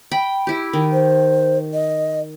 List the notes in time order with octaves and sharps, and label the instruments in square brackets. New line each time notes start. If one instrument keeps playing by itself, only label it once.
[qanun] G5 B5
E4 G4
D#3
[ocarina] C5
D#5